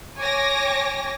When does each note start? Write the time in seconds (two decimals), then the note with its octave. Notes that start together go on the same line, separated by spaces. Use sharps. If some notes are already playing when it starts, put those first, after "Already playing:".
0.19 C#5 G#5 D6 A#6